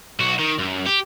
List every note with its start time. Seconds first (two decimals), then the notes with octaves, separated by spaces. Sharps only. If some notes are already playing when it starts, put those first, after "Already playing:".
0.20 B1 F#4
0.39 D#3
0.59 F#2
0.86 G4